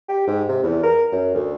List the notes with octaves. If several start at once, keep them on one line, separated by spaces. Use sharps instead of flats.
G4
G#2
C3
E2
A#4
F#2
D2